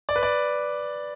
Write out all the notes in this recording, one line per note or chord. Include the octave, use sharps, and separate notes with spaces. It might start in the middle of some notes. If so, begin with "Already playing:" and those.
D5
B4
D5